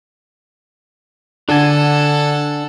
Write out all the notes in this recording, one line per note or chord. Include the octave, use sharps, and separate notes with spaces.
D3 D4 A4 F#5 G#5